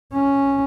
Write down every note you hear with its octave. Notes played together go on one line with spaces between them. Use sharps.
C#4